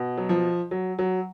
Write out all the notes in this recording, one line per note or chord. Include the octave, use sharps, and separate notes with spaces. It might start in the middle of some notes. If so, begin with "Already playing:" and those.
Already playing: B2
F#3
F3
F#3
F#3